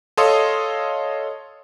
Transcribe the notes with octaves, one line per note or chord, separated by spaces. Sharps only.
A4 C#5 D#5 F5 C6 D#6